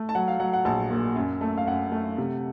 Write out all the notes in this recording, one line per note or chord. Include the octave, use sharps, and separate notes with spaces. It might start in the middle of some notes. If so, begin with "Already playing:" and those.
Already playing: A3
A5
F#3 F#5
F5
F#3 F#5
F#5
A#1 A5
A#2
F#2
A3
F5
F#2 F#5
A3
C3